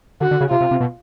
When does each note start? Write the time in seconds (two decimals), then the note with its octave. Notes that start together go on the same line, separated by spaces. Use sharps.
0.21 D3 F#4
0.31 D3
0.41 C#3
0.51 C3 F4
0.61 C3
0.71 C3
0.80 B2